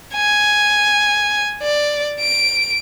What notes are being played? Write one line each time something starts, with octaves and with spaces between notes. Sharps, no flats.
G#5
D5
D7